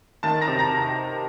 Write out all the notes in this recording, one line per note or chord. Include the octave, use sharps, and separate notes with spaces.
D#3 A5 A6
A#5 A#6
C3
A#5 A#6